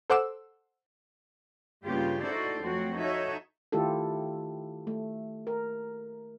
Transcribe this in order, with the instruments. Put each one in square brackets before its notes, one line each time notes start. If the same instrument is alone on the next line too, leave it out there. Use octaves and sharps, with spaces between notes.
[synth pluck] A4 C5 F#5 D6 E6
[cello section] G2 C#3 A#3 B3 F4 G4
D#4 E4 F#4 A4 C5 D5
F2 F#3 A3 C4 F#4
D#4 F#4 A4 C#5 E5
[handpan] D#3 A3 E4 F4 G4 A4
A3
A#4